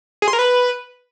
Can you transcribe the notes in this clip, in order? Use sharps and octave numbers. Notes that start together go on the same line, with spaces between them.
G#4
C6
A#4
B4